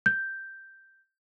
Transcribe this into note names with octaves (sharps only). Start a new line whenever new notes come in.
G6